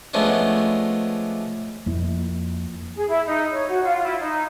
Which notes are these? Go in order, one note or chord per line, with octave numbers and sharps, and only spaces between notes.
F3 G#3 A3 B3 C#4 D4
F2 A#3 E4
G#4
E4
D#4
C#5
F#4
F4
E4
D#4